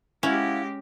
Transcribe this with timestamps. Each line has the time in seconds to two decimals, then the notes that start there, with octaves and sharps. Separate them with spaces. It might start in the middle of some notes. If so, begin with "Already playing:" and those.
0.23 G#3 C#4 E4 G4 F5 F#5